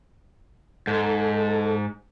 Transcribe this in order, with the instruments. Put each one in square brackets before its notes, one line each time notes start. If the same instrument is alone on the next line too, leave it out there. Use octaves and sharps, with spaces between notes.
[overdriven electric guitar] G#2 [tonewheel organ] A4